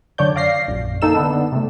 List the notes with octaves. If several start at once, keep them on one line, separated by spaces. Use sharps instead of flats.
F#2 D3 C#5 D5 G6
D5 F5 A#6 C7
A#1 F#2
D#3 A#3 D#4 A4 E6 E7
D3 B3 D4
C3 A3